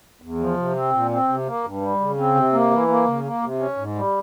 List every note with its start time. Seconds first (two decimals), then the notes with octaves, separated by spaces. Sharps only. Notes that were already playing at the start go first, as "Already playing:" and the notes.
0.22 E2
0.40 F3
0.57 C3
0.75 C4
0.93 A#2
1.11 C4
1.28 C3
1.47 A#3
1.64 G2
1.81 G3
2.00 C#3
2.18 C4
2.35 C3
2.53 A#3
2.71 E3
2.88 A#3
3.06 C#3
3.24 A#3
3.42 C3
3.59 C#4
3.77 G#2
3.95 G3